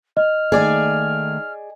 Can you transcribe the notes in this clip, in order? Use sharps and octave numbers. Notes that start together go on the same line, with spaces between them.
D#5 F6
D#3 A3 A#3 G#4 D5 G#5